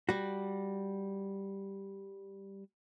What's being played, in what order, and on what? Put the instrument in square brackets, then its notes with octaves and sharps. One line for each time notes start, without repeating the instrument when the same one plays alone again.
[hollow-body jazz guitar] G3 F#4